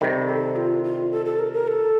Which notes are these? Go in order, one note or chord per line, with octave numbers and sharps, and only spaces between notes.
C3 D#3 G3 G4 A4
A4
F4
F4
A4
A4
A#4
A#4
A4